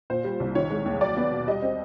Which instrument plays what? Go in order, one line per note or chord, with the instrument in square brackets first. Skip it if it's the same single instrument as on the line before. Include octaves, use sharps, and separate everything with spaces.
[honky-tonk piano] A#2 C5
G3
C2
D#3 C#5
G#3
D#2
F#3 D5
B3
B2
G3 D#5
C4